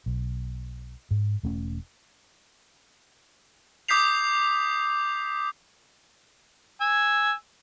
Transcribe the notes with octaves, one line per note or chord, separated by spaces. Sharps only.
B1
G#2
E1 A3 C#4
D6 D#6 G6 B6 C7 F7
G#5 E6